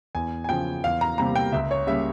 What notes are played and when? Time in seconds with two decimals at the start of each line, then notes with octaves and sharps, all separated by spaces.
0.15 E2 G#5
0.44 G#5
0.49 C#3 F3 G5
0.84 E2 F5
1.01 A#5
1.18 C3 G3 A#3 A#5
1.35 G5
1.52 C#2 E5
1.71 C#5
1.87 C#3 G3 A#3 E5